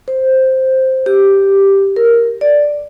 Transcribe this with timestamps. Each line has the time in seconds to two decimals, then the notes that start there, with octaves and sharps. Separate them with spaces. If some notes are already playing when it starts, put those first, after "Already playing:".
0.08 C5
1.06 G4
1.96 A#4
2.41 D5